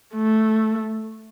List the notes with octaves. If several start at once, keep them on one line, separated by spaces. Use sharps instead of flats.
A3